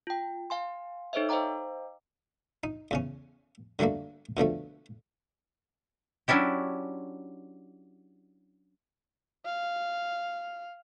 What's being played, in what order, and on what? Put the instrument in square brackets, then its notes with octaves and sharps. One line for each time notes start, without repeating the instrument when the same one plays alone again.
[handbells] F4 G5
F5 G#5 C6
D#4 A4 C5 C#5 D#5 E5
C5 D#5 F5 G5 A#5 D6
[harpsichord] D#4
E2 C#3 C#4
D3 F#3 G3 A3 A#3
B2 D3 F3 A3
[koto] F#3 C#4 D4 E4 G4
[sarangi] F5